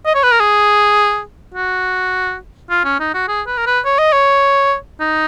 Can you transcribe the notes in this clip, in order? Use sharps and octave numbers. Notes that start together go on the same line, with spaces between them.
D#5
C#5
B4
A#4
G#4
F#4
F4
C#4
D#4
F#4
G#4
B4
A#4
B4
C#5
D#5
C#5
D#4